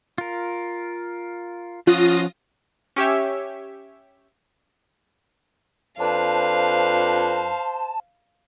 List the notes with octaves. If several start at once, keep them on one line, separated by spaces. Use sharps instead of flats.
F4 A#4
F3 C#4 F4 F#5 D#6 A#6
C#4 G4 C#5 E5
F2 D4 B4 C5 F5 A5